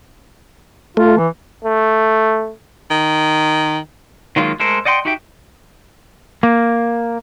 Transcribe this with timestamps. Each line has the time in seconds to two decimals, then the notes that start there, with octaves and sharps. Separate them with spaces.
0.97 A3 F4
1.17 E3
1.64 A3
2.91 D#3
4.36 D#3 F#3 G#3 A#3 F4
4.60 G#3 A3 A4 A#4 C5
4.85 D5 D#5 F#5 G5 C6
5.05 D#4 F#4 G4 E5 G5
6.43 A#3